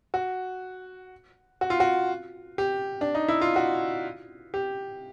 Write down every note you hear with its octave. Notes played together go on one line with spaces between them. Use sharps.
F#4
F#4
F4
F#4
G4
D4
D#4
E4
F4
F#4
G4